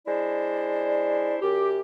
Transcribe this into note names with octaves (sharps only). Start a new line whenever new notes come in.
G#3 D4 E4 C5 D5
F#2 G4